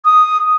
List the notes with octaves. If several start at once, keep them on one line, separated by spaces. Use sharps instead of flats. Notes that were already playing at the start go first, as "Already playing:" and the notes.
D#6